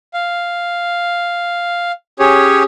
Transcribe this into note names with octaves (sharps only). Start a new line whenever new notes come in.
F5
C#4 G4 G#4 C#5